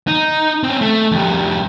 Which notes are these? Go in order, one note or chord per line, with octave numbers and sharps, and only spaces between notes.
D#4
C4 C#4
A3
F2 G3